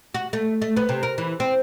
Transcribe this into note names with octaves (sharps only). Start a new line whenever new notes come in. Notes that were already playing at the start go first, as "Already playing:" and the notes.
F#4
A3
A3
B3
C3
A#4
E3
C4